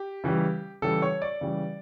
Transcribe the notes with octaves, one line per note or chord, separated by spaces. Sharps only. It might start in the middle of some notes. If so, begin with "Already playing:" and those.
Already playing: G4
C#3 E3 G3
C#3 E3 G3 A4
C#5
D5
C#3 E3 G3